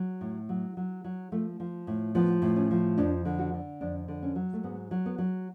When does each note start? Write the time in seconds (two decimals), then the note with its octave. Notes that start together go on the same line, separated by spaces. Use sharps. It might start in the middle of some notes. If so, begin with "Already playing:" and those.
Already playing: F#3
0.21 A2
0.49 F#3
0.77 F#3
1.04 F#3
1.32 F3 A3
1.60 F3
1.87 A2
2.15 F3 B3
2.42 A2
2.56 C#4
2.71 F3
2.97 F2 D4
3.25 D3
3.39 F#4
3.54 D3
3.81 F2 D4
4.08 D3
4.23 C#4
4.35 F#3
4.53 A3
4.63 G#2 B3
4.91 F#3
5.06 B3
5.18 F#3